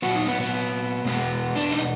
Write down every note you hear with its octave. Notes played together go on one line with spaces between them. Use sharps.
A#2 F#3 B3 F#4
D#4
B3
B3
B2 G#3 B3
D4
D#4